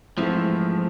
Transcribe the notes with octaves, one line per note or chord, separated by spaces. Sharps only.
G#2 E3 F3 A3 C4 E4